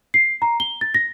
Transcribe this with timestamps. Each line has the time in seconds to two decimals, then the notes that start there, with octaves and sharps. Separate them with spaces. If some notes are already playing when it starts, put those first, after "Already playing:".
0.14 C7
0.42 A#5
0.60 G7
0.81 A6
0.94 A#6